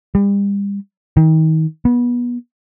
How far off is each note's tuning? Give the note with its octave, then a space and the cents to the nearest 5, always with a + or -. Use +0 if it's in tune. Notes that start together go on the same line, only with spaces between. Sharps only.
G3 +35
D#3 +35
B3 -25